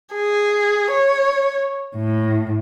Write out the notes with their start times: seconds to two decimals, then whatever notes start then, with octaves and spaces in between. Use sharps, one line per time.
0.14 G#4
0.91 C#5
1.96 A2